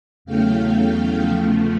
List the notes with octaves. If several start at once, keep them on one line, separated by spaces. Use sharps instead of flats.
E2 C#3 F#3 A3 F5 G5
E2 C#3 F3 A3